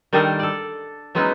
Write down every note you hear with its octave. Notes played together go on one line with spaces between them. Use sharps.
D#3 G3 D4 D#4 A4 A#4
A4 D5
F#3 G#3 B3 C#4 D#4 E4